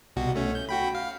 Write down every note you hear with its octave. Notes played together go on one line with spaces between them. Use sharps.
C2 B2 F#4
A3 C#4
G6
F#4 G5 B5
F5